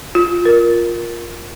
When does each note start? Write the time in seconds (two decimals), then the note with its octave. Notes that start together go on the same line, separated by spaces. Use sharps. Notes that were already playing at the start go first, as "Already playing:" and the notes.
0.15 F4
0.45 A#4